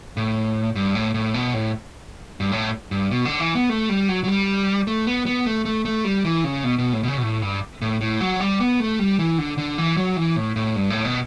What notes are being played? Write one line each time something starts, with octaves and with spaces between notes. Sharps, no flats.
A2
G2
A2
A2
B2
A2
G2
A2
G2
B2
D3
E3
B3
A3
G3
F#3
F#3
G3
A3
B3
B3
A3
A3
A3
G3
E3
C#3
B2
B2
A2
B2
C#3
B2
A2
G2
A2
A2
F#3
G3
B3
A3
G3
E3
D3
D3
E3
F#3
E3
A2
A2
G2
A2
B2